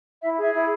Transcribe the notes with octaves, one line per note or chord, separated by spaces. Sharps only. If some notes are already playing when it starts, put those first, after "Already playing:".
E4 E5
G#4
E5
E4